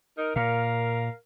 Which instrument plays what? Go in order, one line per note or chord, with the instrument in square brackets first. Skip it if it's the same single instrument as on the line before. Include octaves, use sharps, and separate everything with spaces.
[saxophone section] D#4 A#4
[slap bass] A#2 [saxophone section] A#4 F5